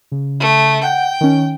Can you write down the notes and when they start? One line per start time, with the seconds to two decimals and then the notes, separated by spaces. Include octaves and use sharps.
0.12 C#3
0.40 A3
0.83 F#5 G5 G6
1.21 D#3 C#4